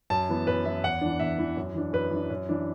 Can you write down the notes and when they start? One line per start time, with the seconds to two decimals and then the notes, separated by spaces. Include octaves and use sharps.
0.10 F#2 A5
0.29 E3 B3
0.47 F#2 B4
0.65 E3 B3 E5
0.84 E2 F#5
1.01 E3 D4
1.20 E2 E5
1.38 E3 D4
1.57 F#2
1.75 E3 D4
1.93 F#2 B4
2.11 E3 D4
2.30 F#2
2.49 E3 D4